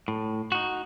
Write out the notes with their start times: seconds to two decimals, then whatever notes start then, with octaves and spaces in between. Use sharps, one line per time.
0.08 A2
0.52 D#4 F#4